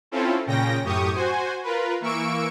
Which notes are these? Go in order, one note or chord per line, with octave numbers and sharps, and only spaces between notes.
C4 C#4 E4 F4 A4
A#2 C#3 C#4 G5 A#6
F#2 A2 G4 C#6 D#6
F#4 C5 G#5
F4 A#4 B4
E3 A#3 C#6 E6 D7